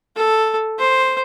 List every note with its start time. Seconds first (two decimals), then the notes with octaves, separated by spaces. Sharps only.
0.16 A4
0.79 C5